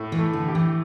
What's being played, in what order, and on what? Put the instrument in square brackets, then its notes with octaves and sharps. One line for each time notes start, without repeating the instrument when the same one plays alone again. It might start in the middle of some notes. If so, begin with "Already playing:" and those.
Already playing: [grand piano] A2
[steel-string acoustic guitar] E3
[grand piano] A3
[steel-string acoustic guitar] D3
[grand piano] G4
[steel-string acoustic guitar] E3